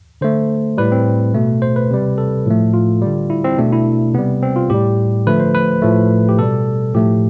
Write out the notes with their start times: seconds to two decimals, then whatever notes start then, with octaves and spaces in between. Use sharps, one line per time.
0.21 D3 A3 C5
0.78 A2 G3 B4
0.92 C4
1.34 B2 A3
1.62 C5
1.76 B4
1.91 C3 G3
2.18 A4
2.46 A2 F3 A3
2.74 F4
3.02 D3 G3
3.30 E4
3.44 C4
3.58 B2 A3 D4
3.72 E4
4.14 C3 G3 B3
4.43 C4
4.56 F4
4.70 A2 G3 G4
5.26 D3 F3 A3 B4
5.40 C5
5.55 B4
5.82 A2 F3 A3
6.29 G4
6.39 B2 G3 A4
6.94 A2 F3 A3 G4